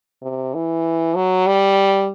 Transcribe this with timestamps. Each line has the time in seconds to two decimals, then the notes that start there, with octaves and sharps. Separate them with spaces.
0.23 C3
0.54 E3
1.15 F#3
1.47 G3